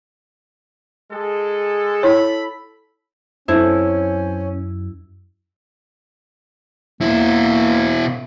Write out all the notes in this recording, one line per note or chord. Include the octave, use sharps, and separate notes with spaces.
G#3 G#4 A4
E4 A4 C#5 B5
F#2 C4 C#4 E4 A4 C5
B2 A#3 E4